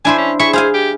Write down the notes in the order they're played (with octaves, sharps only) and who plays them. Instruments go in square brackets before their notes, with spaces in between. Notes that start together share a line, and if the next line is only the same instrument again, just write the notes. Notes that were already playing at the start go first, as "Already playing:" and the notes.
[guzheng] D4 E4 C5 [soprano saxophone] G#5
[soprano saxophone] C#4
[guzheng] E4 G#4 E5 [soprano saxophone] C#6
[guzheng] G#4 F5 G#5 [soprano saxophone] C5
[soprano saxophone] G4